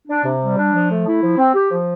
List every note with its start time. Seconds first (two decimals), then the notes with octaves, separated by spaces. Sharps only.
0.08 D4
0.24 C3
0.40 G3
0.57 D4
0.73 F3
0.89 A3
1.06 E4
1.22 F3
1.38 C4
1.54 G4
1.71 F3